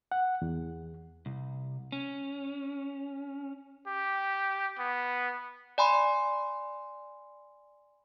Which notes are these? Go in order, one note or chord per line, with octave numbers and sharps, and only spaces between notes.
F#5
E2
C2
C#4
G4
B3
D5 G#5 B5 C6